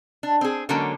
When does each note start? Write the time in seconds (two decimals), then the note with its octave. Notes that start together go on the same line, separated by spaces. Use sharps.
0.23 D4
0.41 C4 G#4
0.69 D3 F#3 G#3 A#3 C#4